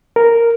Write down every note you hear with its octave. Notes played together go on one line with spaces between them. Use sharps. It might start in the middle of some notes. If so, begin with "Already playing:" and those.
A#4